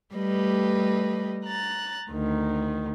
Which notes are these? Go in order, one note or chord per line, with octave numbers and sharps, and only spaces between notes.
G3 A3 G4 B4 D#5
A#5 F#6 A6
D2 D#3